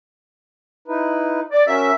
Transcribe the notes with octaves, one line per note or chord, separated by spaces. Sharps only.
D#4 E4 B4
D5
C#4 F#4 A#4 E5